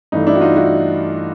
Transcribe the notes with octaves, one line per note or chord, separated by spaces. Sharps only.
G2 E3 A3 D#4
D4 E4
F#4
D#4 F4
E4 F#4